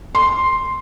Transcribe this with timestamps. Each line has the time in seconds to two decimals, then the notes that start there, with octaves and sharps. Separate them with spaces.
0.15 C6